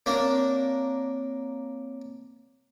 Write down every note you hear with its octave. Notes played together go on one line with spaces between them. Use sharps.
A#3 C4 D4 C#5